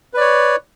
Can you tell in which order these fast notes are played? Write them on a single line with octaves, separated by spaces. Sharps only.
B4 D5 C#5